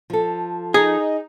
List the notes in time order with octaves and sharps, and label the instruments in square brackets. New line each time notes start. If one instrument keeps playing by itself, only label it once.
[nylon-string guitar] F3 A4
[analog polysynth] D#4 [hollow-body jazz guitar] G#4